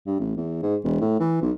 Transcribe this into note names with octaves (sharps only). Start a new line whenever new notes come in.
G2
A1
E2
G#2
E1
A2
E3
B1